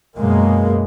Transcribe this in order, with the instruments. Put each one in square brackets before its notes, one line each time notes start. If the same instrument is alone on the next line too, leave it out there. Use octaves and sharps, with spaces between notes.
[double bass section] F#2 B2 G#3 A#3